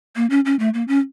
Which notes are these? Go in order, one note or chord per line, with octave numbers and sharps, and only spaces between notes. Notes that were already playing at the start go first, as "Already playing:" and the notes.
A#3
C#4
C#4
A3
A#3
C#4